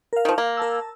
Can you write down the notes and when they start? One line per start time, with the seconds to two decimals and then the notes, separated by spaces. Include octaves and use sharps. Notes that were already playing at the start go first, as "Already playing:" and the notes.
0.13 A#4 F5
0.25 D#3 F3
0.38 A#3
0.57 A#4 A5 E6